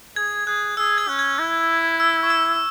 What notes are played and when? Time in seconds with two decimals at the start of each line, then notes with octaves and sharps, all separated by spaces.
0.16 G#4 G#6
0.47 G#4 F#6
0.77 G#4 E6
0.98 G#6
1.08 C#4 F#6
1.19 G#6
1.39 E4
2.00 E6
2.23 C#6
2.30 E6